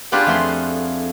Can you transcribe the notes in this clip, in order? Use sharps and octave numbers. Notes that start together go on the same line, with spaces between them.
B3 D4 F4 G4 G#4 B4
F2 A3 B3 G#4 C6